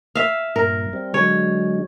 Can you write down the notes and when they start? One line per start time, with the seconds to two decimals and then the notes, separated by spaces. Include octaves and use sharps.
0.15 E5 F5
0.56 G2 A#2 A#4
0.93 G3 C4
1.14 D3 F#3 G#3 C#5